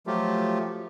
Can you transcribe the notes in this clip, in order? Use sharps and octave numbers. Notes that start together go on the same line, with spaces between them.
F3 F#3 A3 F4 G4